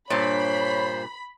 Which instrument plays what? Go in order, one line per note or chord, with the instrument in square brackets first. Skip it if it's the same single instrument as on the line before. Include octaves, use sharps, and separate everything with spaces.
[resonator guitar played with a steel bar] G2 A#2 [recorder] C5 [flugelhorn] C#5 [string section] B5